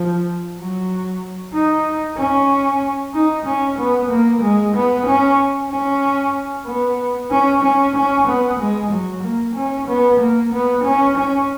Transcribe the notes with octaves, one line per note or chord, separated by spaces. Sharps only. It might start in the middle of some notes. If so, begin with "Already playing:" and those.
Already playing: F3
F#3
D#4
C#4
D#4
C#4
B3
A#3
G#3
B3
C#4
C#4
B3
C#4
C#4
C#4
B3
G#3
F#3
A#3
C#4
B3
A#3
B3
C#4
C#4